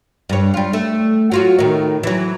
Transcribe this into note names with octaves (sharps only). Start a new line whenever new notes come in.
G2 C#5
G3 F4
A3
F#3 F4 F#4
A2 D#3
E3 F#3